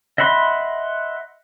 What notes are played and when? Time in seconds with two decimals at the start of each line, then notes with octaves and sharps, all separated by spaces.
0.18 D#5 E5 F#5 B5 C6